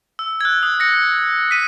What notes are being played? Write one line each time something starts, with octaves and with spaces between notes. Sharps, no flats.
E6
G#6
F#6
D#6
A#6 C#7
B6 D#7